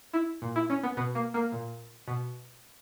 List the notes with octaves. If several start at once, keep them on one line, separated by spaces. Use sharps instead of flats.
E4
A#2
E4
C#4
B3
B2 B3
A#3
A#3
A#2
B2